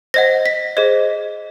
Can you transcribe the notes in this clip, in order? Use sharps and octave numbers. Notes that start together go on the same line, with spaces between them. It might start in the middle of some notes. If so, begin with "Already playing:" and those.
C5 D#5 F#5 A#6
B6
G#4 C5 D#5